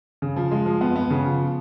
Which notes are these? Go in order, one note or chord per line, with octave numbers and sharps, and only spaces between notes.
C#3
F3
G#3
F3
B3
B3
C#3
F3